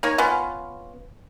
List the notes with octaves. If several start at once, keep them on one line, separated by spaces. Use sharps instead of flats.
A#3 D#4 C#5
B3 C#4 F4